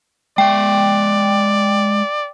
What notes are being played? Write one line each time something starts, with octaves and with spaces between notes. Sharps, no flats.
G#3 D5 E5 G5